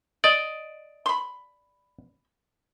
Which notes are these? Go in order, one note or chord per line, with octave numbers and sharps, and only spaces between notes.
D5 D#5
B5 C6